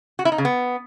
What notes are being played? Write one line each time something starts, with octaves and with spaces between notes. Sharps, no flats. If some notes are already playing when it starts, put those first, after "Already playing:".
F#4
E4
D#4
C#3
B3